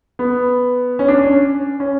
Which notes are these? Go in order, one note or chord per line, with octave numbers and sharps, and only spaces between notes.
B3
C#4
D4
C#4
C#4